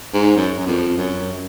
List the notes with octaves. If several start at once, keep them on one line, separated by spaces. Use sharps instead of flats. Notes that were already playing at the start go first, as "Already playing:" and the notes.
G#2
F#2
F#2
F2
F#2